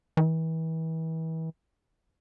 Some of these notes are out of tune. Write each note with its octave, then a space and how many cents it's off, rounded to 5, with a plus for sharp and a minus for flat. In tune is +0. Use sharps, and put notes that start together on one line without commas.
E3 -35